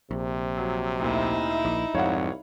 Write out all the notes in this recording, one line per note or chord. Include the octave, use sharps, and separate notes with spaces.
A#1 C3
F#3
D2 A#2 D#4 E4
A#1
C2 F2 G#2 C#5 F5 F#5